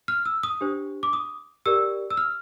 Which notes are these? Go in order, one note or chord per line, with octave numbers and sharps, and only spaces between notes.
F6
E6
D#6
D4 G4 C5
D6
D#6
G4 A#4 D5 E6
E6
F6